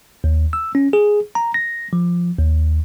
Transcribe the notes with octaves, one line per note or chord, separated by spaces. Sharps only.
D#2
E6
C#4
G#4
A#5
A#6
F3
D#2